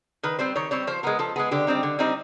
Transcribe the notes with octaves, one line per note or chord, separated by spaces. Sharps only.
D#3 B4
G3 C4 C5
D#3 C#5
G3 C4 C#5
F3 C5
G#3 B3 A#4
F3 A4
G#3 B3 G#4
D3 G4
G3 C4 D#4
D3
G3 C4 D#4